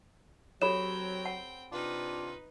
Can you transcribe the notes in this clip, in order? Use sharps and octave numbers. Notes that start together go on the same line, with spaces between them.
F#3 C4 G4 A4 C#5 G5 B5 E7
F#5 A5
C3 D4 D#4 F4 B4